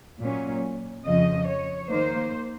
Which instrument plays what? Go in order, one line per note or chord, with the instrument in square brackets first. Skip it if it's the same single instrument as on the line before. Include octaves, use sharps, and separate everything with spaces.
[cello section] A#2 F#3 C#4
F2 C#3 F3 D#5
C#5
D#3 A#3 D#4 C5